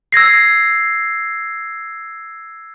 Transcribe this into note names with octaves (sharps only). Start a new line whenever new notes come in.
E6 G#6 A#6 C7